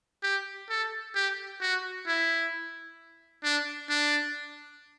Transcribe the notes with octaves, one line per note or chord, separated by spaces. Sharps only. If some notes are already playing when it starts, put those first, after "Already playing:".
G4
A4
G4
F#4
E4
D4
D4